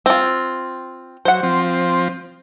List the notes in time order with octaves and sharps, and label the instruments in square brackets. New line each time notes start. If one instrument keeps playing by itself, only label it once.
[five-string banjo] C4 F4
[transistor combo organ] F#3 [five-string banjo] C5 F#5
[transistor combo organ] F3 C4